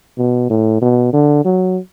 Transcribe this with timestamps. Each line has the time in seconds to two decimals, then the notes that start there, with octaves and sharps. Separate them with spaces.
0.18 B2
0.50 A2
0.81 B2
1.13 D3
1.45 F#3